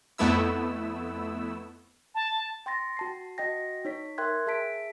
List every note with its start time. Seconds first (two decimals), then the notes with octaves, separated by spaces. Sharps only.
0.18 F2 A3 B3 E4 E6
2.15 A5
2.66 G5 C6 A6 A#6
2.97 F#4 A5 C7
3.38 F#4 D#5 G5 A#6
3.85 D#4 C#5 B6
4.18 A#4 E5 G5 C6 F#6 G#6
4.47 G#4 E5 A5 B6 D7